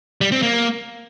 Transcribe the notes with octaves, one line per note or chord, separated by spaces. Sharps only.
G3
C4
A#3